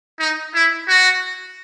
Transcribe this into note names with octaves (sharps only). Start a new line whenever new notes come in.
D#4
E4
F#4